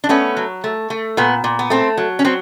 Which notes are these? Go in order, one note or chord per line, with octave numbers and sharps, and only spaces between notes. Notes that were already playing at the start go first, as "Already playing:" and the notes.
D4
A3 B3 C#4
F#3
A3
A3
A#2 B3
A#2
B3
A3 C4
F#3
C#4
F#3 C4